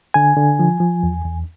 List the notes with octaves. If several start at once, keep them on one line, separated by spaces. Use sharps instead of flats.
D3 G#5
D3
F3
F3
E2
E2